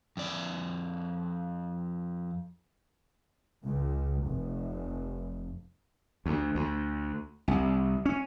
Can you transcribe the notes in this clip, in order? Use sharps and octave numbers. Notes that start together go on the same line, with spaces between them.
F2 D5
C#2
F1
D2
D2
C2
C#4